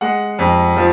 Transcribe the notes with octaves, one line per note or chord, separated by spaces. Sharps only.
G#3 F#5
F2
F3